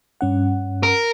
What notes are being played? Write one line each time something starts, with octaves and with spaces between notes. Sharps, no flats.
G2 C#4 F#5
A#4